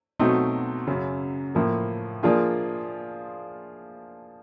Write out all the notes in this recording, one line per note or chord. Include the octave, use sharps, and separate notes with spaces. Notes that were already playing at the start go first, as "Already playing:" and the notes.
B2 F#3 A3 C4 D#4
F#2 C#3 F#3
A2 F3 A#3
F3 A#3 D4 F4 G#4